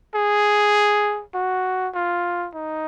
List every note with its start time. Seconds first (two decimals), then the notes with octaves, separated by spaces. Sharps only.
0.15 G#4
1.35 F#4
1.95 F4
2.55 D#4